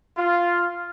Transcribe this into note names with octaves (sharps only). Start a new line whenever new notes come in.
F4